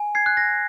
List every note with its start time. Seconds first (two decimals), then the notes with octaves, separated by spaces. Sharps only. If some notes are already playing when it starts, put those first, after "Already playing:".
Already playing: G#5
0.15 G#6 C7
0.26 F#6
0.37 A#6